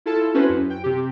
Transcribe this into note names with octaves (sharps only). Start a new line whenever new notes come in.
E4 F4 A4 A5
C#4 E4 F#4 B4 C5
F#2
G5
C3 G4